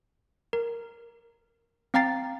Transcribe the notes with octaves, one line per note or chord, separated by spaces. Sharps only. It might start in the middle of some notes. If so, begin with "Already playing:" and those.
A#4
C4 F5 G5 A#5 A6 C7